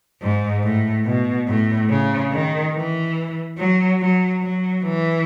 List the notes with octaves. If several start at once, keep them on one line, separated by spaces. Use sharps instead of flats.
G#2
A2
B2
A2
C#3
D#3
E3
F#3
F#3
F#3
E3